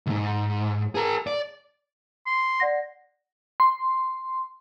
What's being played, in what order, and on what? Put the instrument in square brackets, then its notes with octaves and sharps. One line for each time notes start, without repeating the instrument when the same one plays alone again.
[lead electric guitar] C2 G#2
G#4 A#4
D5
[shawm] C6
[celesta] D5 F#5 A#6
[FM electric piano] C6